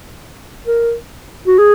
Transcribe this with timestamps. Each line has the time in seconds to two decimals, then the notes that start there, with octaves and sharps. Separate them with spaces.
0.66 A#4
1.47 F#4
1.58 G#4